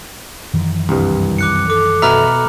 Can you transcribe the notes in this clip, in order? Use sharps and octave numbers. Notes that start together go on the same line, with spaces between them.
F#2 D#3 E3
C2 G2
D6 F#6 C#7
A4 D6
B2 E5 A#5 B5 F6